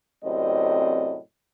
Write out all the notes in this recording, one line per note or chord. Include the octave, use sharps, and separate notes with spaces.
F#2 A2 C3 C4 D5 D#5